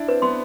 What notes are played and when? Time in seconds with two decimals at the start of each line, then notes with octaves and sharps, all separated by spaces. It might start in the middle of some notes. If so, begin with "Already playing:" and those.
Already playing: D4 E4
0.08 C4 B4
0.22 B3 C6